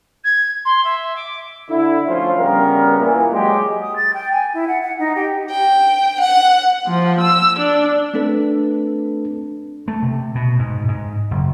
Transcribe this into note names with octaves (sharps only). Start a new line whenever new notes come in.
G#6
C6
E5
D6
D3 E4
D2 F3 C#4 F4 C5
C#3 G3 B3 A#4
A#2 E3
F#3 G#3 G4
D#6
A6
G5
G#5
E4
F#5
F#5
D#4
G4
G5
F#5
F3
E6
D4
A3 C4 D4 A4 B4
A3
C3
B2
G#2
G#2
F#1